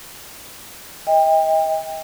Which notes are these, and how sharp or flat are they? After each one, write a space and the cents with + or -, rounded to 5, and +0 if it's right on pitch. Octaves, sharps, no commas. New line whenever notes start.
D#5 +35 G5 +30